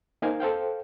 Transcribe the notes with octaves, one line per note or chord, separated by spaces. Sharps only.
A#3 D#4 A#4 C5 F5 G#5
A4 C5 F5 G5